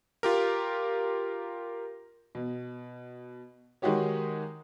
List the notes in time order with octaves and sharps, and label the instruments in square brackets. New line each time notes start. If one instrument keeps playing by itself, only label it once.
[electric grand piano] F4 G4 A#4
[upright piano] B2
D#3 G#3 D#4 F#4 G4 C#5